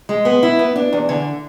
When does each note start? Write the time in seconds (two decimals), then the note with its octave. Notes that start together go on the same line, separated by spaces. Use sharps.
0.09 G#3
0.25 B3
0.43 E4
0.59 B3
0.76 D4
0.93 E2
1.09 D3